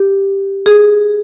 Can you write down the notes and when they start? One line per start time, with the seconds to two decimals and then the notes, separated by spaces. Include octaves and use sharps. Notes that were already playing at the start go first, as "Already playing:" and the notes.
Already playing: G4
0.66 G#4